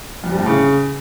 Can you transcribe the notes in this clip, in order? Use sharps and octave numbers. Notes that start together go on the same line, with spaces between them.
F2
G2
A2
C#3